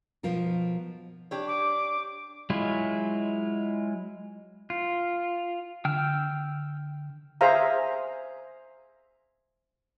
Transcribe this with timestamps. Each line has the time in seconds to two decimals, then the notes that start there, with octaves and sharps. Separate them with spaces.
0.23 B2 F3 F4 A#4
1.31 D4 G4 C#5
1.46 D6
2.50 F#3 G#3 E4 F4
4.70 F4
5.85 D3 G5 E6 F6
7.41 G#4 C5 E5 F5 A#5